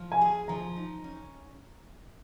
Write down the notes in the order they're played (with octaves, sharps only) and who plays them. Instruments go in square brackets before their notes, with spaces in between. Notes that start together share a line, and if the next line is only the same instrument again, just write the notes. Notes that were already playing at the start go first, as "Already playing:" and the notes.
Already playing: [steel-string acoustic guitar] F3
[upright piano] G#5
[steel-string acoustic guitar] G#4
[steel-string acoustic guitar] F3 [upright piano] A#5
[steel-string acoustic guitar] D#4
C#4